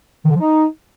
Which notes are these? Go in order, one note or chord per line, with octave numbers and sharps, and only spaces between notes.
D#3
D3
F3
D#4